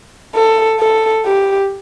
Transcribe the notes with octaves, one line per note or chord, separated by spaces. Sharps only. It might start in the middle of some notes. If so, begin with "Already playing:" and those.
A4
A4
G4